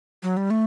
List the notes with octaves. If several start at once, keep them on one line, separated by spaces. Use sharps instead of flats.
F#3
G3
A3